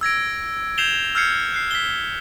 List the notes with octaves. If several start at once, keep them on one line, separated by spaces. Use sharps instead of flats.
E6 G#6 A#6 D7
G6 G#6 C7 E7 F7 G7
E6 F6 G6 G#6 C7 C#7
F#6 C7
B6 G7